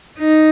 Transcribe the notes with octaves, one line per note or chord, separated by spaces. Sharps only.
D#4